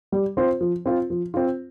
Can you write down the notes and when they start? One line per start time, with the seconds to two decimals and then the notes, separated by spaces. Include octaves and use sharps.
0.12 G3
0.37 C4 F4 C5
0.61 F3
0.86 C4 F4
1.10 F3
1.34 C4 F4